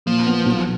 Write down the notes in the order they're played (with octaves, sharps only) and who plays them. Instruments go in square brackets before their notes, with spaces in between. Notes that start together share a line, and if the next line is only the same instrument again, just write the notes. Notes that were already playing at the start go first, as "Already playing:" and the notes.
[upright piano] A#2 [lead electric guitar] F3
[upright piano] B3
B1